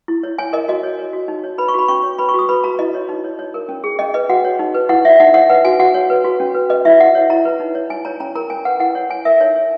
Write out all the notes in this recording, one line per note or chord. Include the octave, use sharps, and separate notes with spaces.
E4
C#5
C#5 G#5
A#4 D#5
F#4 D#5
C#5
C#5
F#4
D#4
C#5
B4 B5
C#6
F#4 B5
C#4 C#6
C#5
B4 B5
C#6
F#4
D#6
B4 B5
F#4 A#5
E4 D#5
C#5
D#4
C#5
C#5
A#4
C#4
G#4
C#4 D#5
B4 D#5
F#4 F#5
C#5
D#4
B4
E4 F#5
C#5 E5
D#4 F#5
C#5 F#5
B4 F#5
F#4 G#5
F#4 F#5
C#5
B4
F#4
C#4
B4
B4 D#5
E4 E5
E4 F#5
C#5
E4 A#5
B4
D#4
C#5
E4 G#5
C#5 A#5
C#4 A#5
A#4 A#5
C#4 G#5
B4 F#5
E4 F#5
C#5
C#5 G#5
A#4 E5
D#4 C#5
C#5